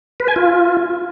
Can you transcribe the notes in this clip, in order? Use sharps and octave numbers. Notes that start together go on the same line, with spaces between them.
B4
G#5
F4